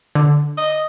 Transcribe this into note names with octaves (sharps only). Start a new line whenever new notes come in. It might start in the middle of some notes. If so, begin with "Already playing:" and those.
D3
D#5